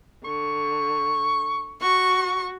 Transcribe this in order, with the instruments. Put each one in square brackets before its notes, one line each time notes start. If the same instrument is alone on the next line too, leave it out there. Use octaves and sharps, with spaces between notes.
[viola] D3 [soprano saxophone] C#6
[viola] F#4 [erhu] C#6